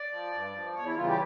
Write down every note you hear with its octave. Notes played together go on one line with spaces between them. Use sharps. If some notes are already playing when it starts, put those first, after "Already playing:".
Already playing: D5
F3
G2
F3
E2 C#5
E4
C#3 E3 G3 F4
G4